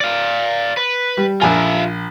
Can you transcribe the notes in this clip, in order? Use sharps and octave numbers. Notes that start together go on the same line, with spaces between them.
D5 F5
B4
G3
A#1 F4 E5 G#5